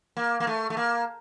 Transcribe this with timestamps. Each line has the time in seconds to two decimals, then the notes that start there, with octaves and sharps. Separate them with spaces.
0.17 A#3
0.40 A#3
0.47 A3
0.70 A3
0.77 A#3